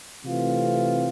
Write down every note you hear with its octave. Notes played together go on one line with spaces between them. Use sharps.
C3 E3 A3 C4 F4